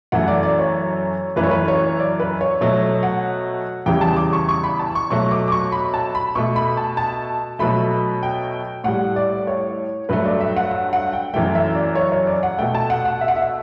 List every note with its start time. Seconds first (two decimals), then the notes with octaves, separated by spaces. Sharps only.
0.12 F#2 E3 A3 F#5
0.28 D5
0.43 D5
0.59 C#5
1.36 F#2 E3 A3 B4
1.44 C#5
1.51 B4
1.68 C#5
2.00 D5
2.20 B4
2.41 C#5
2.61 B2 F#3 A3 C#5
3.03 F#5
3.86 E2 C#3 E3 G3 G5
4.01 A5
4.16 D6
4.33 C#6
4.49 C#6
4.64 B5
4.79 A5
4.95 C#6
5.10 B2 F#3 A3 C#6
5.31 D6
5.48 D6
5.52 C#6
5.72 B5
5.94 A5
6.15 B5
6.35 B2 A3 C#6
6.56 B5
6.77 A5
6.97 A5
7.59 B2 F#3 A3 B5
8.23 G5
8.84 A2 G3 F#5
9.16 D5
9.47 C#5
10.09 G2 F#3 A3 B4
10.25 D5
10.41 E5
10.56 F#5
10.71 F#5
10.93 F#5
11.13 G5
11.34 F#2 E3 A3 G5
11.55 E5
11.75 D5
11.95 C#5
12.12 C#5
12.27 D5
12.43 F#5
12.58 B2 A3 G5
12.75 A5
12.90 F#5
13.05 F#5
13.21 E5
13.28 F#5
13.36 E5